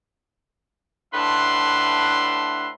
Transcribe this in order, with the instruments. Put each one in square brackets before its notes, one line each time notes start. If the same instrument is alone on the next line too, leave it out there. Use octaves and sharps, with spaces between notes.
[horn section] A2 D4 B4 E5 F#5 C6